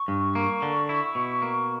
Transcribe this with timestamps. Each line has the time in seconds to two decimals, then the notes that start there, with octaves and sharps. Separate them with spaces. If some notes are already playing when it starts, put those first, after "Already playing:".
Already playing: C#6
0.08 G2
0.35 A#3
0.62 D3
0.89 E4
1.15 B2
1.42 A#3